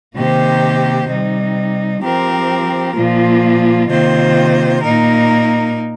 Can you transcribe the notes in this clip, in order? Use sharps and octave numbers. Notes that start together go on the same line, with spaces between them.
C3 D#3 A#3 G4 C5
C3 G3 D#4
F3 C4 G4 A#4
A#2 F3 A#3 F4
C3 D#3 A#3 F4 C5
A#2 A#3 D#4 A#4